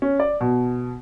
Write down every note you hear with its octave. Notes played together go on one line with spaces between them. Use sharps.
C#4
D5
B2